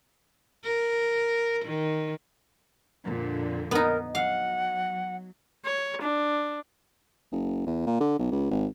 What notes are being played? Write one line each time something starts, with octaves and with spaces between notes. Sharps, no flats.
A#4
D#3
F2 A#2 D3
B3 D#4 A#4
F#3 F5 F#5
C#5
D4
F#1
E2
A#2
D3
B1
C#2
G#1